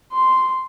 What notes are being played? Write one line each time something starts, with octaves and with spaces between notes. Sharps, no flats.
C6